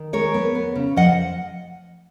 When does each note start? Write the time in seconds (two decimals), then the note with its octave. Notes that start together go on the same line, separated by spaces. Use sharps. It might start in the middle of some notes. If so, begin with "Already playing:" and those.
Already playing: D#3
0.13 G#3 A#4 C#5
0.34 B3
0.55 B3
0.76 C#3
0.96 F3 D#5 F#5